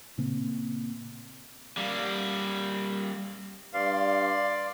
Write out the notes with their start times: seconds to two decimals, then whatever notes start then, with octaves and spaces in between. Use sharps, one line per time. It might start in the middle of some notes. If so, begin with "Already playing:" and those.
0.18 A#2 C#3 A#3 C4
1.77 G3 A#3
3.74 G2 D5 F5 C6